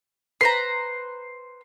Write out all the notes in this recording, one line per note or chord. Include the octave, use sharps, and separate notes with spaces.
B4 C5 A#5 C7